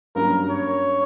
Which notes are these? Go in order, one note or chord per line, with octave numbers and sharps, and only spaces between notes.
G2 F#3 A#3 C#4 A#4
C#5